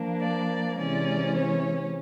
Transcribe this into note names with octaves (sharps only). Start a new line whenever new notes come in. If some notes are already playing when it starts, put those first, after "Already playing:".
Already playing: F3 A#3 D4
D5
C3 E3 G#3 C#4 D5
C#5